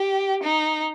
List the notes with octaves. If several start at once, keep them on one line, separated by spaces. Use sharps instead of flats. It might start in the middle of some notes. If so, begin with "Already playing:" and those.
Already playing: G4
D#4